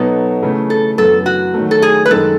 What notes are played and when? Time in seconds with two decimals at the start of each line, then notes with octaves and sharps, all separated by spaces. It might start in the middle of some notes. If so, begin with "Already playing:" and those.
Already playing: B2 F#3 B3 D#4 A4
0.42 C#3 E3 A3 E4
0.70 A4
0.98 F#2 E3 B3 A4
1.26 F#4
1.54 D#3 F#3 A3
1.71 A4
1.82 G#4
2.06 B4
2.10 F#2 D#3 G#3 A4